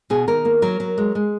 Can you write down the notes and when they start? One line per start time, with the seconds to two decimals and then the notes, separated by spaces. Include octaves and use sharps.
0.10 B2 G#4
0.28 D#3 A#4
0.45 A#3
0.62 F#3 A#4
0.80 F#3
0.98 G#3
1.15 G#3